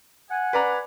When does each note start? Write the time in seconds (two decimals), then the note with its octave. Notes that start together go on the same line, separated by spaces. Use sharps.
0.30 F#5 G#5
0.53 B4 D5 A#5